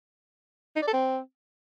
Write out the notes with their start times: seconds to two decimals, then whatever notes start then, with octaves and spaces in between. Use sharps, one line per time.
0.76 D#4
0.82 D5
0.88 A4
0.93 C4